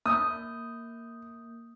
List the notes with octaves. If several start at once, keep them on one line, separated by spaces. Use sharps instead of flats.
A#3 D#6 G6